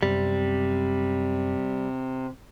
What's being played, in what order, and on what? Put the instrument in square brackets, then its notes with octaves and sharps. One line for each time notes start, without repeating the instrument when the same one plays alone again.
[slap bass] F#2 B3 [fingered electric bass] C3 [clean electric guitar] G3